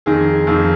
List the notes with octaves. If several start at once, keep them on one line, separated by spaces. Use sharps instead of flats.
F2 D#3 G#4
F2 D#3